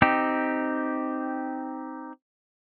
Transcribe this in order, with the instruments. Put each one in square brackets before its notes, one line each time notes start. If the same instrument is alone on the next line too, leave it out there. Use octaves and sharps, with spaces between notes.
[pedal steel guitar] C4 D#4 G4